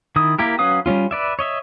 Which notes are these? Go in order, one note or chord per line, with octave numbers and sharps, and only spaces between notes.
D#3 E4 D#6
A#3 E4 G4 A#4
F#3 C#4 B4 F5 D#6
G3 C4 C#4 F4
B4 D5 E5
C#5 D#5 E5